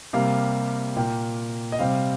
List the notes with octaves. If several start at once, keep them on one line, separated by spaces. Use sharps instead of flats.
C3 G3 A#3 F5
A#2 A#3 G5
D#5
C3 G3 C4 F5